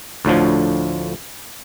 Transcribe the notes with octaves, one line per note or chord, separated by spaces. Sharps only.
D2 A2 D3 F3